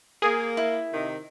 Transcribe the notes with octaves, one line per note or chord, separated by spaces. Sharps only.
A#3 G#4
E4
C3 D#3